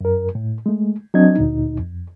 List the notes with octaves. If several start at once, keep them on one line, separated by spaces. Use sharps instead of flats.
F#2 A#4
A2
G#3 A3
F#3 C4 D4 D#5 G#6
D2 A#2 D#4
F2